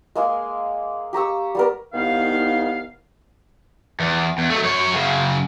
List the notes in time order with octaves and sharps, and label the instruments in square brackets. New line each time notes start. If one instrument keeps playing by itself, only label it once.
[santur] G#3 A#3 G#4
G4 A#5 C#6 E6
G3 B3 A#4
[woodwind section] C2 D#3 B3 D#4 F5
[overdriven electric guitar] E2
E2
F#3 A3
F#2 C#5
F#2 C#3